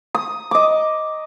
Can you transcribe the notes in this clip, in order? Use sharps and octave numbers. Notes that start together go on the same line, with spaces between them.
D#6
D#5 D6